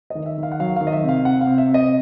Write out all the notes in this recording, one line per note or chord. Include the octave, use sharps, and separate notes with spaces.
D#3 D#5
E5
D#3
F5
F#5
F#3 F5
D#3 F5
D#5
E5
C3
F5
C3 F#5
F5
C3
E5
C3
D#5